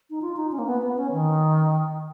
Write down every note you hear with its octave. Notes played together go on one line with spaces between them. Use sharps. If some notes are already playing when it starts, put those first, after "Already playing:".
D#4
F4
D#4
C#4
A#3
B3
B3
C#4
D#3